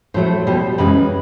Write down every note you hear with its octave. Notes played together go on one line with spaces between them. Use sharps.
A2 F#3 A3 C5
B2 G3
F#2 C#3 E3 G#3 B4